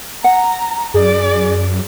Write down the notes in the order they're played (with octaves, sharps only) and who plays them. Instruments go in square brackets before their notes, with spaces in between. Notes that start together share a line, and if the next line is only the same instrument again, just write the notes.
[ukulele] F#5 [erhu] A#5
[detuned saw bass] F#2 [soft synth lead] G#4 [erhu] D5